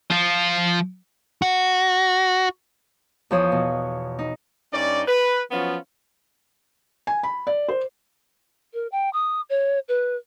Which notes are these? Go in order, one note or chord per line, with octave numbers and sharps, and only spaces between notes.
F3 F4
F#4
E2 F3 C#5 D#6
B2
D#4
G2 C#4 D#4 D5
B4
F3 F#3 B3 C#4 F4
G#5
B5
D5
C5
A#4
G5
D#6
C#5
B4